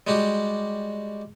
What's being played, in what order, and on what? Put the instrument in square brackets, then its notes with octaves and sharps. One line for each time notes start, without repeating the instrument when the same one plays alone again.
[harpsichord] G3 G#3 F#4 G4